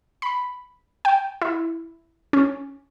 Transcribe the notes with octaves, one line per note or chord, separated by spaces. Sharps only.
B5
G5
E4
C#4